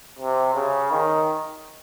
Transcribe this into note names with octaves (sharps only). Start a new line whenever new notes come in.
C3
C#3
D#3